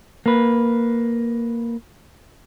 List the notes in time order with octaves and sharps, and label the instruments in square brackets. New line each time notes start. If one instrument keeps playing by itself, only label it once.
[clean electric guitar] A#3 B4